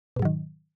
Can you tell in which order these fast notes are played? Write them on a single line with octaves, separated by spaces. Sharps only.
B2 G#2 F#3 D#3